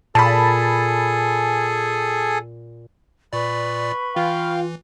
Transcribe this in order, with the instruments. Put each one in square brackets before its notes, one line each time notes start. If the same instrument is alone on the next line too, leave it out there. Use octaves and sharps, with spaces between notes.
[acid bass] A#2 [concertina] G#4 A4 G#5 [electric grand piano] A5 B5
[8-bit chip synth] A#2 D5 [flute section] B4 B5 C#6
[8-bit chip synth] E3 [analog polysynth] F4 [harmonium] F5 G5